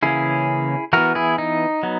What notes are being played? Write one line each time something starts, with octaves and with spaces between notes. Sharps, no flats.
C#3 E3 A#3 C#4 E4 G#4
E3 B3 F#4 A#4
E4 G#4
D#4
F#3 B3